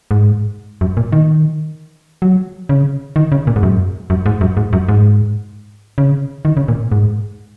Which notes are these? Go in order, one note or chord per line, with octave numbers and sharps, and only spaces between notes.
G#2
F#2
A#2
D#3
F#3
C#3
D#3
C#3
A#2
G#2
F#2
F#2
G#2
F#2
G#2
F#2
G#2
C#3
D#3
C#3
A#2
G#2